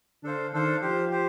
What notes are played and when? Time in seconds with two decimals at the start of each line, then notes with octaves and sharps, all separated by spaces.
0.24 D3 D4 A4 C5 F5
0.53 D#3 D4 A4 C5 F5
0.82 F3 G4 C5 F5
1.11 G4 C5